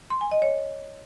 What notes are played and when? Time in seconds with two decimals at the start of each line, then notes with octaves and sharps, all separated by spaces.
0.10 C6
0.21 G#5
0.31 D#5
0.42 C#5